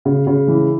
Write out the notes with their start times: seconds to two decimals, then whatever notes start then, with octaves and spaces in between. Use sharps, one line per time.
0.05 C#3
0.27 C#3
0.48 E3